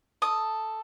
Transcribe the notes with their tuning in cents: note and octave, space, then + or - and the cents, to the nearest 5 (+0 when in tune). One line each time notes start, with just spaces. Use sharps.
A4 +0 D#6 +0